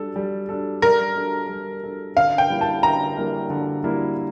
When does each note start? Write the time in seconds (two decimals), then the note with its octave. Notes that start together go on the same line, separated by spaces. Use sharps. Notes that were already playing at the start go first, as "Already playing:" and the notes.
Already playing: G3 D4 A4
0.16 G3
0.49 D4 A4
0.82 G3 A#4
1.16 D4 A4
1.49 G3
1.83 D4 A4
2.16 D3 F5
2.38 G5
2.50 G3 A#3 E4 A#4
2.61 A5
2.83 D3 A#5
3.17 G3 A#3 E4 A#4
3.50 D3
3.84 G3 A#3 E4 A#4